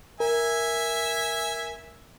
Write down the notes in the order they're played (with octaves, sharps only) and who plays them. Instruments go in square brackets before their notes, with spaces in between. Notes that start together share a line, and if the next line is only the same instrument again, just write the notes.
[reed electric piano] A#4 [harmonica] E5 G#5